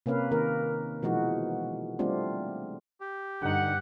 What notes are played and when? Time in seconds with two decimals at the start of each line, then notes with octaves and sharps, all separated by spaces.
0.06 C3 A#3 C#4 B4 F5
0.31 D#3 A#3 A#4
1.02 B2 E3 F3 G#3 D#4 F#4
1.99 G3 A3 C4 D4 F4
3.01 G4
3.42 G2 D3 D#4 F#5